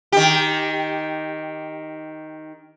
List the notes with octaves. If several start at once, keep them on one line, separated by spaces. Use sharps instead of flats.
D#3 G4